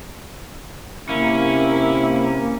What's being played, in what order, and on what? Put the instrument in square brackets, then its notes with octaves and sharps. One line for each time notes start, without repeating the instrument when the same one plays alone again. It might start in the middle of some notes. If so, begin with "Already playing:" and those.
[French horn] C3 [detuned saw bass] A#3 [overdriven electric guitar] C#4 [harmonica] E4